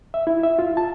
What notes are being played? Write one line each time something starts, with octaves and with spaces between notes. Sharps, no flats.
E5
E4
E5
F4
A5